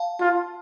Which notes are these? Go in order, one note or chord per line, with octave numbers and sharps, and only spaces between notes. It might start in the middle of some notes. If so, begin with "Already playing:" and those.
Already playing: F5 A5
F4